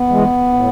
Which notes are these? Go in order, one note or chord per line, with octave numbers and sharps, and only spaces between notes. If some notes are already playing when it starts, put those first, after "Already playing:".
Already playing: B3
E3 G#3
A2